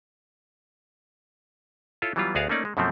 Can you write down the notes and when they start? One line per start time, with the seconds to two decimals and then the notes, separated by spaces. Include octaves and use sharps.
2.02 E4 F4 A4 C#5
2.16 E3 F#3 G3 B3 F4
2.35 D2 B3 F#4 G#4 D5 F5
2.49 A3 A#3 C#4 D#4 D5
2.65 G#3
2.77 F#2 B2 F3 A3 C4